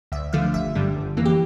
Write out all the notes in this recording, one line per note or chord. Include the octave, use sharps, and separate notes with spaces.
D2 E5
D3 F3 A3 F5
G1 E5
G2 D3 G3
G1
F2 E3 A#3
G4